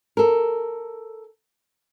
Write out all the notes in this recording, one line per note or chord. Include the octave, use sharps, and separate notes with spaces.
A4 A#4